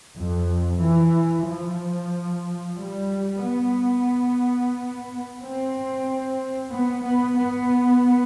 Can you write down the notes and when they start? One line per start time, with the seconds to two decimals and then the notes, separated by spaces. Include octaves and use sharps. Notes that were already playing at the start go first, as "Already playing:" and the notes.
0.17 F2
0.81 E3
1.47 F3
2.78 G3
3.44 B3
5.40 C4
6.72 B3
7.04 B3
7.37 B3